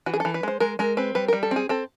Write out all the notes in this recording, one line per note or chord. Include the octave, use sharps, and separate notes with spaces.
E3 F#4
G#4
A4
E3
B4
G#3 C5
G#3 A#4
G#3 A#4
C4 B4
G3 B4
G3 A#4
A4
C4 G#4
C4 A4